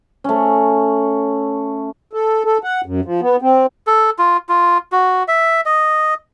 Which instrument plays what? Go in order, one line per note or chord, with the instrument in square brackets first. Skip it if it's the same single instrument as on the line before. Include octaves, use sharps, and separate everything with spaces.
[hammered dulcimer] A3 C#4
[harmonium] A4
A4
F#5
F#2
F3
B3
C4
[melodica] A4
F4
F4
F#4
E5
D#5